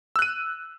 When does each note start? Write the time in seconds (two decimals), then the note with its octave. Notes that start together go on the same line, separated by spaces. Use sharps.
0.16 E6
0.19 F#6
0.22 D#7